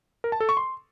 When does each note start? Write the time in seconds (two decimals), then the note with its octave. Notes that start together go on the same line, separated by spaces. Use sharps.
0.24 A#4
0.32 A5
0.40 A4
0.49 C#6
0.57 C6